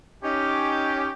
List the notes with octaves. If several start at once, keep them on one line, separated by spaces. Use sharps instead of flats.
C#4 D#4 G4